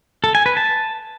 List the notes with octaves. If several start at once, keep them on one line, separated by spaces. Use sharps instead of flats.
A4
G#5
B4
A5